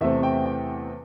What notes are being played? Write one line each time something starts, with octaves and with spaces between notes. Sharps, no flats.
E2 C3 A3 C4 E5
G5
G5